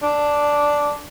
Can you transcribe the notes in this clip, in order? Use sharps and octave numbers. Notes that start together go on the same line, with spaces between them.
D4